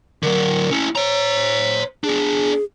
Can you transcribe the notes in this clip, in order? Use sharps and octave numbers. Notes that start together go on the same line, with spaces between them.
D3 F#3 A#4
C#4 E4
C5 C#5 A#5
B3 D4 G#4